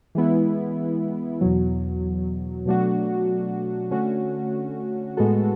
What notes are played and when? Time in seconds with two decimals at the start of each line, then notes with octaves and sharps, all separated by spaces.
0.15 E3 G#3 B3 E4
1.41 E2 B2 F#3
2.66 B2 F#3 A3 D4 F#4
3.91 D3 A3 C#4 F#4
5.17 A2 G#3 B3 F#4 A4